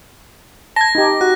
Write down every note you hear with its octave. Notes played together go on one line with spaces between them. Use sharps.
A5 G#6 A#6
D#4 G4
F#4 F#6